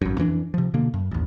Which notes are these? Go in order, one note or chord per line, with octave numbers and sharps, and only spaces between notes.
G#1 F#2
F2 E3 C#4 D4
C3 F3
B2 D3 A#3
F#2
A1 D#2